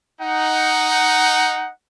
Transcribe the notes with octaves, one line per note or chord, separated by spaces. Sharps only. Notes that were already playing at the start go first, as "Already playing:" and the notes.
D#4 F#5